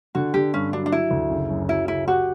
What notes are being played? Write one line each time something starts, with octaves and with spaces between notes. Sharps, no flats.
D3 F#4
D3 G4
G2 C#4
F#3 D4
D4
F#3 E4
D2
F#1
F#2
F#3 E4
C#3 E4
F#4 G4